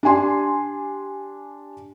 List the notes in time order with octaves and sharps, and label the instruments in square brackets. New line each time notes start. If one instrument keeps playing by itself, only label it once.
[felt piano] D4 G4 G#5 C6